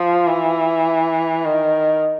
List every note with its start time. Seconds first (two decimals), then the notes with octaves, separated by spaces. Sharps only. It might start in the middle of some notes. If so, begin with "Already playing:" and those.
Already playing: F3
0.28 E3
1.45 D#3